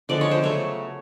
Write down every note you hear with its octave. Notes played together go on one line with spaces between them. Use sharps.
D3 F3 G#3 B3 D5
C#5
C5
C#3 F#3 A3 C#5